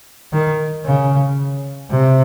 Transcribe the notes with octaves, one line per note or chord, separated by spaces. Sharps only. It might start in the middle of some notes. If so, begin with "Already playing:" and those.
D#3
C#3
C3